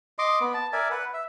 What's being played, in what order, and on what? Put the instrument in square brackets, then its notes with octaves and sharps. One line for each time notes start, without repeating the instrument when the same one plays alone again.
[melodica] D#5 C6 D6
B3
A5
A#4 D5 E5 G#5
B4 F#5
E5